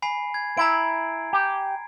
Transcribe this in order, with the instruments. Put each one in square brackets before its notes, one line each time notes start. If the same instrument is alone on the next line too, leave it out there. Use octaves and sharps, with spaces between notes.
[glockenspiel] G#5 B5 C7
G#6
[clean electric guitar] E4 [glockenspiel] A#5 G#6 D7
[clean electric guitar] G4